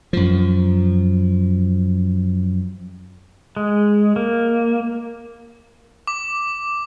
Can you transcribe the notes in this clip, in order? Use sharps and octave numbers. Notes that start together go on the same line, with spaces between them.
F#2 F3
G#3
A#3
D6